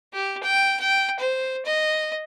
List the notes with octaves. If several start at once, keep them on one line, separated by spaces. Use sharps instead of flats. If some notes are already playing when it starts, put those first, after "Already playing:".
G4
G5
G5
C5
D#5